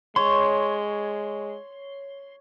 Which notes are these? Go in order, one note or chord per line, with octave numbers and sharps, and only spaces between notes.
G#3 C#5 C6